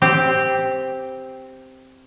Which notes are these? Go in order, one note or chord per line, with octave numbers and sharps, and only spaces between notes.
C4 G4